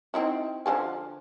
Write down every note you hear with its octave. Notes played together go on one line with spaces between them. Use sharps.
C4 D#4 E4
D3 F3 G#5